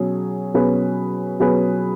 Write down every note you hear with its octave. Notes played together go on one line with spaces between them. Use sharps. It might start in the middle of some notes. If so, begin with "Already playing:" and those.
Already playing: B2 F#3 C#4 G#4
B2 F#3 C#4 G#4 B4
B2 F#3 C#4 G#4 B4